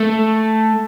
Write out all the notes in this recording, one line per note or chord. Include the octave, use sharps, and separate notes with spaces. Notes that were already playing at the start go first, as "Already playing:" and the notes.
Already playing: A3